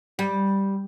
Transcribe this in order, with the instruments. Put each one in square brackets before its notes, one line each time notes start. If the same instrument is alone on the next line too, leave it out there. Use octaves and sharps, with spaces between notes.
[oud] G3